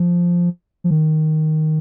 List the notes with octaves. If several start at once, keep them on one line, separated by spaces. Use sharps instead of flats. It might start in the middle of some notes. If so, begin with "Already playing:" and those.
Already playing: F3
F3
D#3